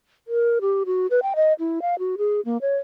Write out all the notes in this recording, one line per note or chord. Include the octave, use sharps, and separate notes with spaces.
A#4
G4
F#4
B4
G5
D#5
E4
F5
F#4
G#4
A#3
C#5